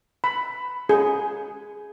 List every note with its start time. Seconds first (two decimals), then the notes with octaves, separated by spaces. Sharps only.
0.24 B5
0.89 G#4